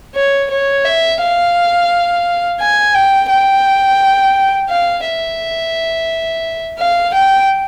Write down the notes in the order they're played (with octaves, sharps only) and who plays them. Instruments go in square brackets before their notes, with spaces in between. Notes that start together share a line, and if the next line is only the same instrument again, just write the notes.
[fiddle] C#5
C#5
E5
F5
G#5
G5
G5
F5
E5
F5
G5